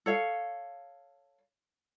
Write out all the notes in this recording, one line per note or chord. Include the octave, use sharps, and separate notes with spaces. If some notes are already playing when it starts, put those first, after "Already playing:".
A4 C#5 F5